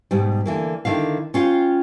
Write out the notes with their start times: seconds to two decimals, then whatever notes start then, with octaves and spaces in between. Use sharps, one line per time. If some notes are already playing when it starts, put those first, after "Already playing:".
0.11 G#2 B2 G3
0.46 D3 E3 A#3
0.85 D3 D#3 E4 F5
1.34 C#4 F4 F5 G5